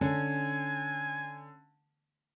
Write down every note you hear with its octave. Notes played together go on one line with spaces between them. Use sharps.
D3 C#4 G#5